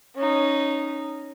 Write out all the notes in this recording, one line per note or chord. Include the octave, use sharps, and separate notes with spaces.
C#4 D#4